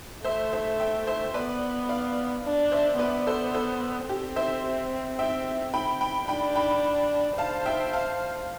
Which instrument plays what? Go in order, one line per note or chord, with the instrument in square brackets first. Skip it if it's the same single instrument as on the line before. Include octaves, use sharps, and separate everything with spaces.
[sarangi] A3 [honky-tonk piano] C5 E5
[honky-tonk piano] C5 E5
E5 G5
C5 E5
[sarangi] B3 [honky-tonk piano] B4 D5
[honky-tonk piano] D5 F5
[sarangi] D4
[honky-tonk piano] C5 E5
[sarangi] B3 [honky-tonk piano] B4 D5
[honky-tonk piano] A4 C5
A4 C5
[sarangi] C4 [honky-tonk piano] G4
[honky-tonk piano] C5 E5
E5 G5
G5 B5
G5 B5
[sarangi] D4 [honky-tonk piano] G5 B5
[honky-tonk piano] G5 B5
[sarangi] C5 [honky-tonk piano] F5 A5
[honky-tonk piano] E5 G5
F5 A5